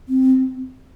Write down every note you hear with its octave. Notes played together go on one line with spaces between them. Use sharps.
C4